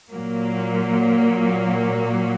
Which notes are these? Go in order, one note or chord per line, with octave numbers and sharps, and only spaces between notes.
A#2 F#3 A#3